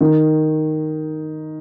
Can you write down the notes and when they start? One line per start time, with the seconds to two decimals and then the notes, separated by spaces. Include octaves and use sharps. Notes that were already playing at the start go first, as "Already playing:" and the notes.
0.01 D#3